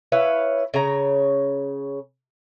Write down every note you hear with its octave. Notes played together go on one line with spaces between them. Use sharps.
E4 B4 C#5 F5
C#3 C#5 A#5